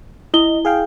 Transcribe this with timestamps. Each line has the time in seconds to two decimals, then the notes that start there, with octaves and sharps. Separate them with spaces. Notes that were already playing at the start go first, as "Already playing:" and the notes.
0.34 E4 D#5 G7
0.65 G#4 F5 G5